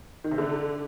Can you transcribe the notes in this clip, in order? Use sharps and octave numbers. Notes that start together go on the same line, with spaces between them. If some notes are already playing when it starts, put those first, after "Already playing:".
D#3
C3
D3